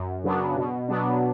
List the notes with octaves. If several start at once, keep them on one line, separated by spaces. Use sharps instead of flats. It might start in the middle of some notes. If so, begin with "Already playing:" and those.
Already playing: F#2
C#3 F#3 B3 D4
B2
F#3 B3 D4